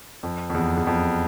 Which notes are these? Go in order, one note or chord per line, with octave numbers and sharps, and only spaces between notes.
F2
F2
E2
E2
F2